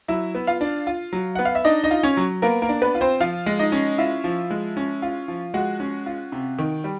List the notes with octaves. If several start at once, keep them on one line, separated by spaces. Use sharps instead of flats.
F#3 E4 E5
B3
F4 F5
D4
F4
F#3
B3 F#5
F5
E5
D4 D#4 D#5
D#4 D#5
F4
C#4 C#5
F#3
A#3 B3 A#4
A#3 A#4
D4
B3 B4
F4
C4 C5
F3 F4 F5
G#3
D#4 D#5
C#4
E4 F4 E5
F3
G#3
C#4
F4
F3
G#3 F#4 F#5
C#4
F4
C3
D#3
G3